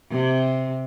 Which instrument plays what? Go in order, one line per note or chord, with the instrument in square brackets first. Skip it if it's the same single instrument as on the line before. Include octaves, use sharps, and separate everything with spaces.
[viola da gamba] C3